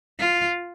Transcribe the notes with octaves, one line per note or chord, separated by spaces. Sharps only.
F4